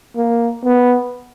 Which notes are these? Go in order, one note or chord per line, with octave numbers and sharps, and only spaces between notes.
A#3
B3